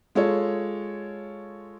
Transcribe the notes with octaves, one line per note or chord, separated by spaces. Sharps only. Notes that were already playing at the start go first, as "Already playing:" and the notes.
G#3 F4 A4 C#5